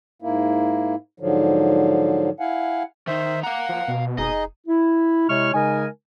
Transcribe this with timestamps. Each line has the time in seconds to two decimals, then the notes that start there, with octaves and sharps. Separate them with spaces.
0.22 G#2 A#3 E4
1.20 G#2 D3 F3 F#3
2.40 E4 F5 F#5 G#5
3.07 D#3 D#4 C5 E5
3.43 F5 F#5 A#5
3.69 F3
3.88 B2
4.18 F1 D#4 G#4 D#5
4.67 E4
5.29 C3 G#3 E4 C#5 C#6 F6
5.54 C#3 G#3 D#4 A#4 G#5